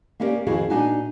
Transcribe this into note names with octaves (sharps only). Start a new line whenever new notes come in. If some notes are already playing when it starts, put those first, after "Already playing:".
A#3 C#4 E4 G4 A#4 D5
F2 D#3 E4 F#4 G#4 F5
A#2 D4 D#4 F#4 G#5